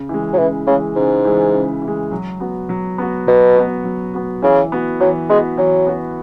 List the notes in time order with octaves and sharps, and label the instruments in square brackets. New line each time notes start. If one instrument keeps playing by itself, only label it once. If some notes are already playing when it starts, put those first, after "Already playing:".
Already playing: [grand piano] C#3
E3 G#3
[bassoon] F#3
[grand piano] C#3 [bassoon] E3
[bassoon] C#3 [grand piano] E3 G#3
[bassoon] G#2 [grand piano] C#3
[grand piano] E3 G#3
C#3
E3
G#3
F#3
B3 F#4
F#3
B3 F#4
[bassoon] B2 [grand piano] F#3
[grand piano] B3 F#4
F#3
B3 F#4
[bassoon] C#3 [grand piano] E3
[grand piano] B3 F#4
[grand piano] E3 [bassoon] F#3
[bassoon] G#3 [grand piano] B3 F#4
[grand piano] E3 [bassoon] F#3
[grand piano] B3 F#4